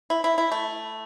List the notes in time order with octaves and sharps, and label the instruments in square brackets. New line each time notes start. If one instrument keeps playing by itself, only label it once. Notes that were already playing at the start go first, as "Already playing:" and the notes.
[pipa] E4
E4
E4
A3